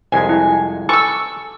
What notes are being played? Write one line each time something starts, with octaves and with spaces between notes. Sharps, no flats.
C2 F2 G#3 G#5
E4
A4 G#5 C#6 E6